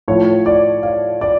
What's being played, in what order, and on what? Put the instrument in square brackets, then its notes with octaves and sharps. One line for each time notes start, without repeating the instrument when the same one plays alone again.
[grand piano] A2 F3 C#5
D5
F5
D5